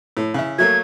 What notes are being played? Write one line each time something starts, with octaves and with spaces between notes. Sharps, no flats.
A2
C#3 E4
F#3 A3 A#3 G#6